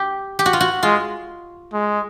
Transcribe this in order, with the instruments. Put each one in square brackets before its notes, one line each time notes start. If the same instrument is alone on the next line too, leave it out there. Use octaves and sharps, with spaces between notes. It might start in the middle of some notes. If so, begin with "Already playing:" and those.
Already playing: [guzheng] G4
G4
F#4
F4
F#4
[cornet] G#3 [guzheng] F4
[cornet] G#3